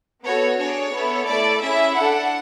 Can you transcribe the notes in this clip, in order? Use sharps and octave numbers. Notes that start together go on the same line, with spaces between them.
B3 F#4 A4 C#5
D4 G#4 C#5
B3 E4 A4
A3 E4 A4 D5
C#4 E4 G#4 E5
D4 A4 F#5